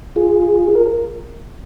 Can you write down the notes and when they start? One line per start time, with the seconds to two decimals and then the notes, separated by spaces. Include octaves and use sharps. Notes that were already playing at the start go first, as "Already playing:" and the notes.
0.16 F4 G#4
0.75 A#4